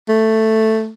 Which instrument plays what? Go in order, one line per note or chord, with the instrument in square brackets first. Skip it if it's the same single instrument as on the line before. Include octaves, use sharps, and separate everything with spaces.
[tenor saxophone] A3